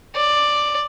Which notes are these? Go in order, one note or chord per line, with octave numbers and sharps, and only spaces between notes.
D5